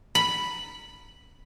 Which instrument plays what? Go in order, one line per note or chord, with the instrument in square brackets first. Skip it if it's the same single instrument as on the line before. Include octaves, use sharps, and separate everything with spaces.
[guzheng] B5